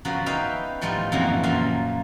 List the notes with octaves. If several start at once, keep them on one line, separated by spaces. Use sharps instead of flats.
C#3 F3 B3 F#4 A#4
D#4 B4 E5 F5 G5
A2 F3 G3 D#4 F4
F2 G#2 C#3 E3 F#3 A#3
F#2 A#2 F3 A#3 F5 A5